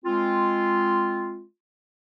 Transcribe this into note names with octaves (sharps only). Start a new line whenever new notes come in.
G#3 C4 F4